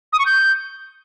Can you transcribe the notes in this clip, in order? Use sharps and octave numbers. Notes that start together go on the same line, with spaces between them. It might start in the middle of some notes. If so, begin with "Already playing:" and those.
D#6
C#6
G6